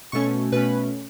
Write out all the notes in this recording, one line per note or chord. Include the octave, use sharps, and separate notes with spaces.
B2 A3 C#4 C#6
B2 A3 C#4 B4